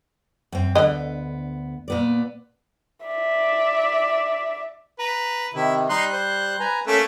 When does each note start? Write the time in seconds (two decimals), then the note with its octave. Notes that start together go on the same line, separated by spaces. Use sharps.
0.52 F#2 C4
0.75 D2 D3 B3 D#5
1.88 A#2 B3 D5
3.05 D5 E5
4.99 B4 A#5
5.54 C3 D#3 E4
5.89 G3 D#4 C6 F#6
6.13 C5
6.60 B4 G#5 A#5
6.87 A3 A#3 C#4 A4